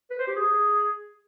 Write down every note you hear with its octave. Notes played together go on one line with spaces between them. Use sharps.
B4
C5
G4
G#4